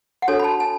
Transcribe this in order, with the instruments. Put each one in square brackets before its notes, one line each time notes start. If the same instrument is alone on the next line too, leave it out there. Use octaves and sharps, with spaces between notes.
[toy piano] F#5
D4 F#4 A4 C#5 G#5
B5
A5
G#5